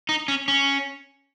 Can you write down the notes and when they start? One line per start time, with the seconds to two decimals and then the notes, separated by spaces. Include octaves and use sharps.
0.09 D#4
0.28 C#4
0.48 C#4